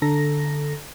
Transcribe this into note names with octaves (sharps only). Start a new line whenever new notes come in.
D3 A4 A#5 A#6